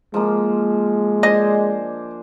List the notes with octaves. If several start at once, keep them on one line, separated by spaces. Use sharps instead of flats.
F3 G#3 A#3
D4 C5 D#5 G#5